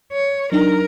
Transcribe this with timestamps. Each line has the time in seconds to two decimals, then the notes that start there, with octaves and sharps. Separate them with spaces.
0.13 C#5
0.52 F#3 D4 D#4 A#4